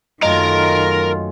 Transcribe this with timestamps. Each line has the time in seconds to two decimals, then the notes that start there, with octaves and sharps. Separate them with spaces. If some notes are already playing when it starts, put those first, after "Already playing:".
0.23 F#2 D#3 A3 A#3 F4 A#4 D#5 A#5